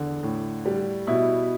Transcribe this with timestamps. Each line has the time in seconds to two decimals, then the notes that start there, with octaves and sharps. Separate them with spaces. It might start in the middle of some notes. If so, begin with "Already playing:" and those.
Already playing: E2 D3
0.23 A2
0.66 G3
1.07 B2 E4